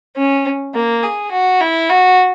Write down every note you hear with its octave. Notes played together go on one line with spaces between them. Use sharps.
C#4
A#3
G#4
F#4
E4
F#4